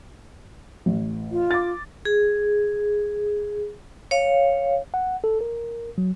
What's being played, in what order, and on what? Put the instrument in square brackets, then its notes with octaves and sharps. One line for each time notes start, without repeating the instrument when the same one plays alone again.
[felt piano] A1
[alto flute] F4
[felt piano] D6 A6
[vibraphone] G#4
C#5 F5
[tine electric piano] F#5
A4
A#4
F#3